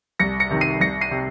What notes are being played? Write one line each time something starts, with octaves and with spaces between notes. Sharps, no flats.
C2 A#6 C#7
A#6 C#7
C3 D#3
C7 D#7
C2 A#6 C#7
C7 D#7
C3